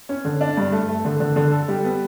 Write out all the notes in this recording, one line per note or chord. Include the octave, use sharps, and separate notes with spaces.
C#4
D3
D4
G2
A3
A3
D3
D3
D3
A4
G3
B3